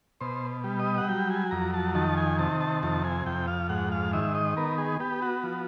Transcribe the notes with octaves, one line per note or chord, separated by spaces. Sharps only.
B2 C5
G3
D#5
F#5
F#3 G5
G#5
F2 A#5
A5
D#3 A5
G#5
C3 A5
A5
F2 A5
G#5
F2 G5
F5
G#2 F#5
F5
D#3 E5
D#5
B3 A#4
G#4
B3 G4
F#4
F3